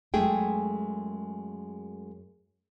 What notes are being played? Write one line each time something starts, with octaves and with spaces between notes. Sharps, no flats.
F#2 G#3 A3 G#4 G5